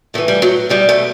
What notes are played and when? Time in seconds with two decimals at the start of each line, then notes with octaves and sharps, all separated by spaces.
0.14 A2 E3 A3
0.28 G3
0.42 F#3
0.69 E2 B2 G3
0.89 A3